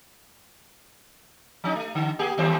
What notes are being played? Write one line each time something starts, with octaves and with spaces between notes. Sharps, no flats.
F3 C#4 D#4
A3
D3
A#3 G4 G#4
D#2 G3 C5